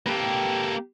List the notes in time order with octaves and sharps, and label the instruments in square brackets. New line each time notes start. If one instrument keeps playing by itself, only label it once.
[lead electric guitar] A#3 A4 [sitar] G4 B4